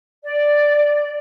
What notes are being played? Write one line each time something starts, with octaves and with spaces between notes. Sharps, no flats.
D5